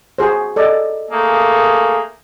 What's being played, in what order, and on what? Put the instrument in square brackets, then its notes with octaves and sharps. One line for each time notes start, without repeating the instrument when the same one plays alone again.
[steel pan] F#4 G#4 C5
A4 D5 D#5
[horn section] A3 A#3 G#4